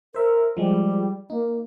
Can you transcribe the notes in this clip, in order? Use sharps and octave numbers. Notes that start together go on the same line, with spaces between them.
A#4 C5 E5
F3 G3 G#3
A#3 D#4